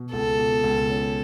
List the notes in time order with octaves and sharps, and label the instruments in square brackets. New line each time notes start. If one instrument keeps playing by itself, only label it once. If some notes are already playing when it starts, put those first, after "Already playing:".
Already playing: [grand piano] B2
[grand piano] C#2 [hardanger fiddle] A4
[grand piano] B2
C#2
C#4